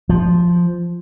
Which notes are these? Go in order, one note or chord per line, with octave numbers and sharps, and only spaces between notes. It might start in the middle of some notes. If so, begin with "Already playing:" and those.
F3